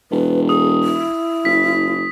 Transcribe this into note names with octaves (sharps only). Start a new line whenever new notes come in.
E1 B4
G#4 D#6
E4
F#1 B6